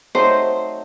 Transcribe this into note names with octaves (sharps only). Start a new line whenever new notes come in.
F#3 A3 C4 D#4 C5